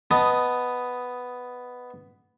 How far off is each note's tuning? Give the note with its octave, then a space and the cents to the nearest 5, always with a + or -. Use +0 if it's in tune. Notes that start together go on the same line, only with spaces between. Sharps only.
B3 +5 D#5 +0 A5 +0